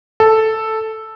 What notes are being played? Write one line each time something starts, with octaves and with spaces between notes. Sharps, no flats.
A4